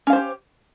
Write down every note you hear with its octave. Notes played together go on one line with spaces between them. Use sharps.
C#4 G4 C5 F5